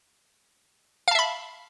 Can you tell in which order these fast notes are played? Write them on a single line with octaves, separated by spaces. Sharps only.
F5 A5 E5 B5